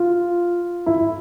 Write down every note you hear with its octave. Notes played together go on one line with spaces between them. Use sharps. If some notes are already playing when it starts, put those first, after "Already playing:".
Already playing: F4
E4